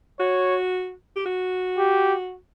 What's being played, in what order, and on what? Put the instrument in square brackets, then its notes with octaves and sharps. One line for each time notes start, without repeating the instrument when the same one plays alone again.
[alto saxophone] F#4 [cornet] C#5
[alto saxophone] G4
F#4
[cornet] G4